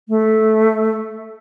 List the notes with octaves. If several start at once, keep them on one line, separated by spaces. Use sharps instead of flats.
A3